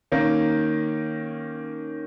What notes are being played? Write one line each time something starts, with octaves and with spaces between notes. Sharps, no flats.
D#3 A#3 C#4